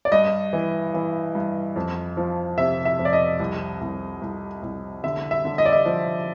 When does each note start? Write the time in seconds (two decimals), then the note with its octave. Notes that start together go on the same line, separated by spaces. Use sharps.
0.05 D5
0.12 G2 D#5
0.53 E3
0.94 E3
1.35 G2
1.76 F2
2.17 F3
2.58 C3 E5
2.85 E5
2.99 F2
3.05 D5
3.13 D#5
3.40 C2
3.81 C2
4.22 C2
4.63 C2
5.04 D3 E5
5.31 E5
5.45 D3
5.58 D#5
5.66 D5
5.73 D#5
5.85 F3